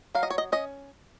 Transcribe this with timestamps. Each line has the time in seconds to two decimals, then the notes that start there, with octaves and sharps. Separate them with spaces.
0.15 F#3 F5
0.23 D#5
0.30 C#5
0.38 D#5
0.52 C#4 D#5